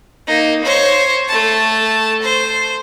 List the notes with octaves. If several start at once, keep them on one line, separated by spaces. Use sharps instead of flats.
A#3 D#4
C5 C#5
A3 A5
C5